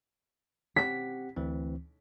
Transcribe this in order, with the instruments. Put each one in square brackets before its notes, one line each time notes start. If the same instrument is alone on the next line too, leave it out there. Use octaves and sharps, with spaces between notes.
[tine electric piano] C4 G4 F#5 [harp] B6
[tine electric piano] D2 E3 C4